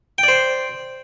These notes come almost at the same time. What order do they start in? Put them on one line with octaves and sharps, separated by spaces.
G5 D5 C5